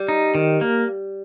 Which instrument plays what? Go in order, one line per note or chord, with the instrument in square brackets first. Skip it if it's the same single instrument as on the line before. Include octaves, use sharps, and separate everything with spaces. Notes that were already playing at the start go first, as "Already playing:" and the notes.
Already playing: [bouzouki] G3
[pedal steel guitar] D#4
D#3
A#3